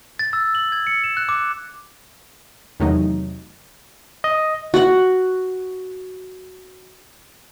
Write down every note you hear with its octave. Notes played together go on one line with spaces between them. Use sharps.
A6
E6
F#7
G#6
C#7
E7
F#6
D6
E2 C3 D#3 F#3 A3 D#4
D#5
F#4 F#5